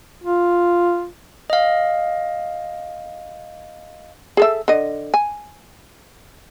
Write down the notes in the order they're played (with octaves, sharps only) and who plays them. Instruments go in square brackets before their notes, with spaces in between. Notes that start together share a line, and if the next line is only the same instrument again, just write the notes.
[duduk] F4
[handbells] D#5 F5
[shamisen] G#4 A4 E5
D3 D#5
G#5